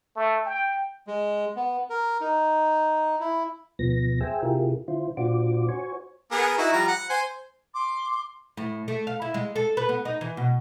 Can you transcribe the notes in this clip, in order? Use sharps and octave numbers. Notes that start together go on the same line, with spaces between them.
A3
G5
G#3
B3
A#4
D#4
E4
D2 B2 F3 B3 A#6
G#4 C5 E5 G5 G#5 E6
C3 E4 F4 G4 G#4 A#4
D3 E4 F4 C5
A#2 D4 F4 F#4 C5 D6
F#4 C5 C#5 G#5 C#6
B3 G#4 A#4
D#4 E4 F#4
F3 G3 A#5
F#5
C5 G#5
C6 D6
A2
A3
F5
E4
G#3
A4
B4
B3
D#4
E3
B2